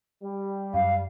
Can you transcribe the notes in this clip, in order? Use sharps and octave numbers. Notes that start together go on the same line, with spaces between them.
G3
F#2 F5